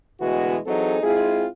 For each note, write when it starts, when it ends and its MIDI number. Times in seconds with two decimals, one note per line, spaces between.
0.21 0.57 38
0.21 0.57 47
0.21 0.57 52
0.21 0.57 56
0.21 0.57 59
0.21 0.57 66
0.67 0.98 52
0.67 0.98 54
0.67 0.98 60
0.67 0.98 63
0.67 0.98 68
0.67 0.98 69
1.03 1.45 56
1.03 1.45 60
1.03 1.45 64
1.03 1.45 65
1.03 1.45 68